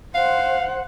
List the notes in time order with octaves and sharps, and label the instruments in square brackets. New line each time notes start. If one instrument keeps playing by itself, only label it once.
[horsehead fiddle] C5 F#5 [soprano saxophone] F5